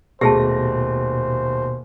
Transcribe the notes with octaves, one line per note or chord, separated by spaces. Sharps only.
D#1 B2 A3 G4 G#4 C5 A5 A#6